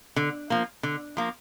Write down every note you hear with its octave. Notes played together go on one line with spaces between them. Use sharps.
D3
F3 A#3
D3
F3 A#3